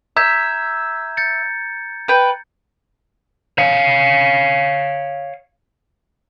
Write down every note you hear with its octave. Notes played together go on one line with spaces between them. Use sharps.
E5 A#5 G6 G#6
G6 A6 C#7
B4 G5
C#5 F5